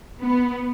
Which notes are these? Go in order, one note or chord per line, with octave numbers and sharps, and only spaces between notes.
B3